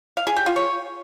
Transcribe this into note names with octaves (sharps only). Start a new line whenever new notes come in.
F5
G#4
G4
F4
C#5